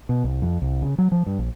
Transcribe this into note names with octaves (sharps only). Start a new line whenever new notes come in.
B2
C2
F2
C2
C#3
F#3
F3
G2
A#1